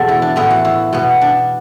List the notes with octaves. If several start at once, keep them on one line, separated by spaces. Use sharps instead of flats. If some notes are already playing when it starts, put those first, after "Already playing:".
Already playing: E2 B2 F#3 B3 A4
E4
D4
A2 E3 B3 E4
F#4
E4
B2 B3
D4